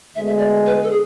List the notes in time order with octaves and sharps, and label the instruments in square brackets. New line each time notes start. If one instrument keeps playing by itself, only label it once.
[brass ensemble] D2 D3 G#3 B3 [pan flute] E5
[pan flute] E5
D5
B4
A4
G#4